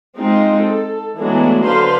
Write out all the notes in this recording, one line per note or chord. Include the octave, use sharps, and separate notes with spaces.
G#3 C4 D#4 F4
A4
E3 F#3 G#3 A3 B3 D4
D3 B4 C5 F5 C6